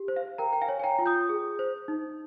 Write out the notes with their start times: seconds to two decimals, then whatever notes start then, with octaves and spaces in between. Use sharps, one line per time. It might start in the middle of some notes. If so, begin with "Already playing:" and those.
Already playing: G4
0.08 C5
0.16 F5
0.38 A#4 G5 A#5
0.53 G5
0.61 F5 G#5
0.69 C#5
0.79 G#5
0.83 G5 A#5
0.99 F4
1.06 D#6 G6
1.29 G#4
1.59 C5
1.88 D#4